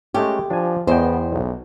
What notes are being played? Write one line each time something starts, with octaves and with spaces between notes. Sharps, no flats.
G#3 A3 C#4 G4
F3 D4 G#5
E2 B3 C5 D#5 G5
B1